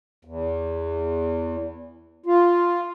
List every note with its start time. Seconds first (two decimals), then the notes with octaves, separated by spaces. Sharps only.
0.25 E2
2.26 F4